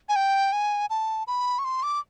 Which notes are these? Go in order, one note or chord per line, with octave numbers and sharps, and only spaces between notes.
G#5
G5
G#5
A5
B5
C#6
C6
D6